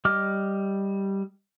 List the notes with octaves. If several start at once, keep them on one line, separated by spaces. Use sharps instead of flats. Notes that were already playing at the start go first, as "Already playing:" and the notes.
G3 D#5 D6 F6